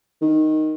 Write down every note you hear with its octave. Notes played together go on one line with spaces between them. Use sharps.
D#3